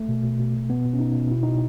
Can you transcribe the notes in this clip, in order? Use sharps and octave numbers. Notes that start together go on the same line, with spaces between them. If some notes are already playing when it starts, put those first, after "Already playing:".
Already playing: A3
B2
B2
B2
B2
B2 B3
B2
C#4
B2 D#4
B2
B2 E4
B2 D#4